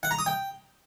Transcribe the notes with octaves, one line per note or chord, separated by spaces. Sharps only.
F#5
A#5
D#6
G5